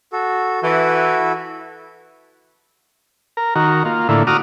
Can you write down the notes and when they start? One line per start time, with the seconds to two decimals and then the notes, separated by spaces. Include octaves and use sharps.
0.13 F#4 A4
0.63 E3 E4 F#4 A4
3.37 A#4
3.55 D#3 F#4 A#4
3.85 A#3 F4
4.09 A2 D3 A#3 E4
4.27 F#4 A#5 D6 D#6 F6